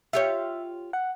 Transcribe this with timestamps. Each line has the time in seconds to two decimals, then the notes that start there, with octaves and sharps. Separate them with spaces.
0.13 F4 G4 C#5 E5
0.93 F#5